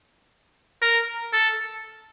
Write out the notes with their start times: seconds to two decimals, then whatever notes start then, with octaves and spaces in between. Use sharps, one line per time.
0.82 A#4
1.33 A4